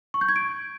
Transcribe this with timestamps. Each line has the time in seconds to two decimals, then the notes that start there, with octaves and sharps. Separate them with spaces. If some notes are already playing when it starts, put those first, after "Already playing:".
0.14 C#6
0.21 G6
0.29 G#6
0.36 D7